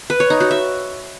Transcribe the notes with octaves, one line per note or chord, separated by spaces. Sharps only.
B4
C#5
D#4
F#4
E5